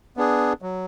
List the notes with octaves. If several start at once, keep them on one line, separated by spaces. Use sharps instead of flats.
B3 D4 G#4
F#3